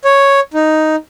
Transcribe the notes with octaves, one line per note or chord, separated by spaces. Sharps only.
C#5
D#4